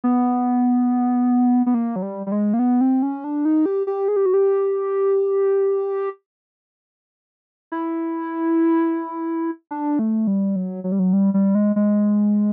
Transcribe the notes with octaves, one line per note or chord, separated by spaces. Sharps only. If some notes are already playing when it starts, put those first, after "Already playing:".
B3
B3
A#3
F#3
G3
G3
G#3
A#3
B3
C4
C#4
D4
D#4
G4
G4
G#4
G4
F#4
G4
E4
D4
A3
G3
F#3
F#3
G3
F#3
G3
G3
G#3
G#3